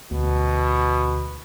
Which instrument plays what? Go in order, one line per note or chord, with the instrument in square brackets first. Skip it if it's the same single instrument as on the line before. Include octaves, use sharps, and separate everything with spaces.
[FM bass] D2 [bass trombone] B2